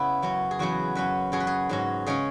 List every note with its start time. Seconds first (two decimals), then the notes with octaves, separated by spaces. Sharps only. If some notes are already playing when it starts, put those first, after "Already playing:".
Already playing: C#3 B3 E4
0.22 F#2 F#3 C#4
0.51 G#4
0.59 E2 C#3 F#3 B3 F#4
0.95 F#2 F#3 C#4 B4
1.32 F#2 F#3 C#4 G#4
1.40 B4
1.47 G#4
1.69 G#2 F#3 C#4
2.06 C#3 G#3 C#4 G#4